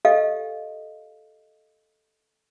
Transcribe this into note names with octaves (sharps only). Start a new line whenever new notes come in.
G4 A4 D#5 F5